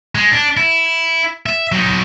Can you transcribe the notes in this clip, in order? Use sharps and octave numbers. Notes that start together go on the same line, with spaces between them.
G#3
D4
E4
E5
F#3 D#4